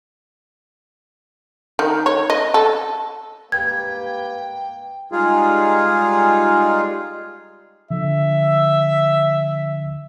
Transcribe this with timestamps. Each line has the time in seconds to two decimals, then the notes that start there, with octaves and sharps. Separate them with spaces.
1.79 D#3
2.06 C#5
2.30 D#5
2.54 A4
3.52 A#3 G4 B4 G5 G#6
5.12 G3 G#3 D#4 F4 G#4
7.91 D3 F3 E5